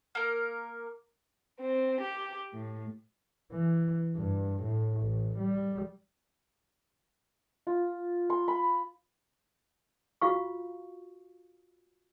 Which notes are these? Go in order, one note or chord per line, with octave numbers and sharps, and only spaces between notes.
A#3 A#4
C4
G4
A2
E3
G2
A2
A1
G3
F4
C6
B5
F4 F#4 F5 C#6